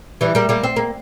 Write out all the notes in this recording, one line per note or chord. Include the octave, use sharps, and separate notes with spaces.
E3 G3
G3 A#3
G3 A#3
C4
A#3